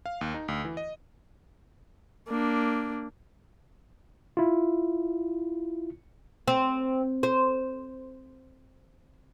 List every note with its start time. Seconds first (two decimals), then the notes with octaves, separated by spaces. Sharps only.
0.06 F5
0.21 D#2
0.34 D#4
0.48 D2
0.65 E3
0.77 D#5
2.28 A#3 D4
4.37 E4 F4
6.48 C4
7.23 C5